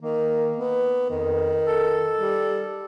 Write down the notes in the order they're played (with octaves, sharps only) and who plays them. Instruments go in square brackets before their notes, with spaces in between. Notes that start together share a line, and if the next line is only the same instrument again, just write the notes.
[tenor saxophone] D#3 [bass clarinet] A#3
[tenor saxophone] B3
[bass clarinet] F2 [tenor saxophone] D#3
[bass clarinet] A4
[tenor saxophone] G3